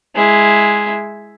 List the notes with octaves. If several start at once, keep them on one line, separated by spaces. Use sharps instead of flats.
G#3 E4